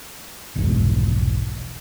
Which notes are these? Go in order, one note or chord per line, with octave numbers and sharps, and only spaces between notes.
F1 B1 E2 G#2